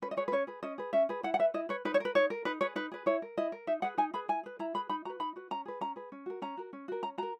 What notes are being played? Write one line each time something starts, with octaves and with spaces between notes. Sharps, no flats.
C#4 B4
D#5
G#4 B4 C#5
B4
C#4 C#5
G#4 B4
C#4 D#5
G#4 B4
C#4 E5
G#4 B4
E4 F#5
F#5
B4 E5
E4 D#5
B4 C#5
D#4 B4
C#5
A#4 B4
D#4 C#5
A#4
D#4 B4
G#4 B4 C#5
D#4 B4
G#4 B4
E4 C#5
A#4
E4 D#5
A#4
D#4 E5
G#4 B4 F#5
D#4 G#5
G#4 B4 B5
E4 G#5
G#4 B4
E4 A#5
G#4 B4 B5
D#4 B5
F#4 B4 A#5
D#4 B5
F#4 B4
C#4 A#5
G#4 B4
C#4 A#5
G#4 B4
C#4
F#4 A#4
C#4 A#5
F#4 A#4
C#4
F#4 A#4
C#4 A#5
F#4 A#4 A#5